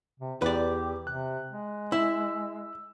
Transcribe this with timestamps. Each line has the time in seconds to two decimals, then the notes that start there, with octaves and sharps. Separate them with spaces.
0.20 C3
0.42 E2 G4 B4 D5
1.07 C3 F#6
1.50 G#3
1.92 E4 E6